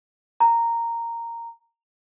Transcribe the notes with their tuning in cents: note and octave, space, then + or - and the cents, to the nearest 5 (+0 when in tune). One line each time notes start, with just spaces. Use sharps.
A#5 -10